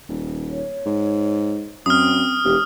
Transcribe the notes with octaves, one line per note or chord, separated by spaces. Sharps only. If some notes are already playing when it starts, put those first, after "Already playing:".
D#1
C#5
G#2
F#2 C4 D#6 F6
E1 G4